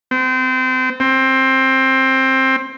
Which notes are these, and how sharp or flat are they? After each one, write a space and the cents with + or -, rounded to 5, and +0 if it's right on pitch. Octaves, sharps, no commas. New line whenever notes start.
C4 -30
C4 +15